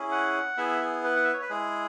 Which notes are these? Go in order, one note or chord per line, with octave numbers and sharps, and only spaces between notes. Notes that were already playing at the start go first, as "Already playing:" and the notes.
Already playing: C#4 E4 G#4
F#5
B3 E4 G#4 E5
G#4
B4
F#5
E5
C#5
B4
G#3 E4 G#4